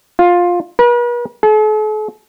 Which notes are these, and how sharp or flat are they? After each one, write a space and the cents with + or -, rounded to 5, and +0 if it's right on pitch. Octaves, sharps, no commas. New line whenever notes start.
F4 +15
B4 -45
A4 -45